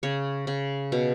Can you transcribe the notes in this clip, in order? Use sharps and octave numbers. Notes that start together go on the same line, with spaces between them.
C#3 C#5
C#3
B2